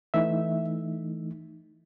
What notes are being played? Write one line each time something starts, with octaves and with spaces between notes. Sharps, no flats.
E3 A3 D#4 E5